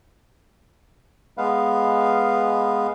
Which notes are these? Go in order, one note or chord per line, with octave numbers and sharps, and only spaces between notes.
G#3 B3 B4 F5